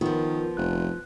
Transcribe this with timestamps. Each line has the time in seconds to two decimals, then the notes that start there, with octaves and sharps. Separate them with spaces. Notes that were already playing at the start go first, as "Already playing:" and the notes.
0.01 D#3 F3 B3 F4 A#4
0.57 F1 F#6